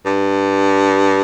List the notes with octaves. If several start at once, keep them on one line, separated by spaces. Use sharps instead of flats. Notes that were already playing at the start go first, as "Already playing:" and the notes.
G2